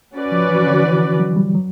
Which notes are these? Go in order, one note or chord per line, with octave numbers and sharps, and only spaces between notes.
C#4 F#4 B4 D5
F3
E3
D3
E3
F#3
G3
F#3